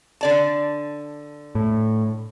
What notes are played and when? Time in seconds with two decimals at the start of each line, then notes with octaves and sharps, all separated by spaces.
0.21 D3 D5 A5
1.55 A2